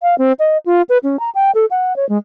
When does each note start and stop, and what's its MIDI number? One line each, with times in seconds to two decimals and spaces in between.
0.03 0.17 77
0.18 0.32 60
0.39 0.58 75
0.66 0.82 65
0.89 0.98 71
1.03 1.19 61
1.20 1.30 82
1.35 1.51 79
1.55 1.66 69
1.71 1.96 78
1.96 2.08 73
2.09 2.18 56